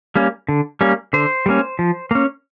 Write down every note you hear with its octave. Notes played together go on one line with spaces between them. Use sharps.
G3 A#3 C#4
D3
G3 A#3 C#4
D3 C5
G3 A#3 C#4
F3
A#3 C#4